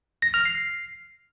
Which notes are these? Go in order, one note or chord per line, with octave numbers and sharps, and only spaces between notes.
A#6
F6
C7